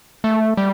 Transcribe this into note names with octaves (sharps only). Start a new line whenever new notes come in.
A3
G3